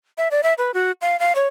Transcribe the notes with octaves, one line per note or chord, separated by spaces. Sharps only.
E5
D5
E5
B4
F#4
F5
F5
C#5